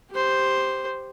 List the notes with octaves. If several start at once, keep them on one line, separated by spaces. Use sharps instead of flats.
G4 C5